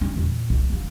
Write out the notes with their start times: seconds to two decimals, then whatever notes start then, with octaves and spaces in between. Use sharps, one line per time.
0.01 C#4 E4
0.17 E2 A#2
0.50 C2
0.70 D3 F3